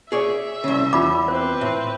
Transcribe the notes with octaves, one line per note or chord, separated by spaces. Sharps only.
G#4 C#5 D5 E5
C2 C#3
E2 F4 B5 D6
C4 B4 C5
A2